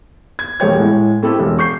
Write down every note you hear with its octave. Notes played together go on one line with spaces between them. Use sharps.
G#6
E1 G3 A3 C#5 G5 G#6
A2 G#3
A3 C4 E4 G4 A4
E1
C#6 G6 C7